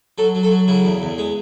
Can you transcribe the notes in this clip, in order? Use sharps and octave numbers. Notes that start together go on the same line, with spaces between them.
F#3 A4
F#3
A4
F#3
C#3 E4
E2
E2
G#3